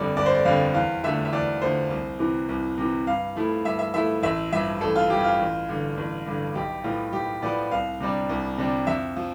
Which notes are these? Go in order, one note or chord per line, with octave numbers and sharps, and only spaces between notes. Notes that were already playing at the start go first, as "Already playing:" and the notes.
Already playing: G1 F2 D3 G3 D5
G1 D5
C5
D5
F2 D3 G3 F5
E2 F5
D3 F3 A3 E5
E5
E2 D5
D3 F3 A3 C5
C2
C3 E3
C2
C3 E3
G2 F5
F3 A3 E4
G2 E5
E5
F3 A3 E4 E5
A1 E5
G2 F3 E5
A1 A4
F4
G2 F3 G4
F4
A1
G2 D3
A1
G2 D3
B1 G4
A2 F3 B3 F4
B1 G4
A2 F3 B3 D5
C2 F5
C3 G3 D4
C2
C3 G3 D4
F2 E5
F3